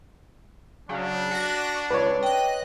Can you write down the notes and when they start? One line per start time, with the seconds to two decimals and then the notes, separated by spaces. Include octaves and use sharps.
0.89 C#3 F#3 D4
1.31 F#4 A#6
1.91 C#2 B4 C#5
2.23 D#5 G5 F#6